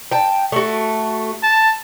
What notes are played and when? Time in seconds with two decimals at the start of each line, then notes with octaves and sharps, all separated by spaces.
0.12 G5 A5
0.52 A3 F#4
1.43 A5